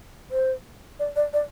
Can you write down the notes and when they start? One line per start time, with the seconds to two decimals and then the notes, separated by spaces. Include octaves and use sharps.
0.31 C5
0.99 D5
1.16 D5
1.33 D5